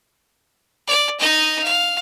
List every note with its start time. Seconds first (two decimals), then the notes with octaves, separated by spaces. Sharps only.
0.87 D5
1.20 D#4 D#5
1.63 F5